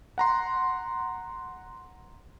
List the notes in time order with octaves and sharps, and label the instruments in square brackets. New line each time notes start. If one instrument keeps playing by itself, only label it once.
[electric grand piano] F#5 A#5 C6